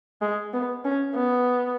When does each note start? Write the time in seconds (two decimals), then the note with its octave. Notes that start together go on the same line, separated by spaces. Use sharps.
0.22 G#3
0.53 B3
0.85 C#4
1.14 B3